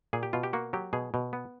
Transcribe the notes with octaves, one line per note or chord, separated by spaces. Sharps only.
A#2 G#4
G4
B2 F4
G4
A#3 F#4
F#3 G4
B2 G#4
B2
B3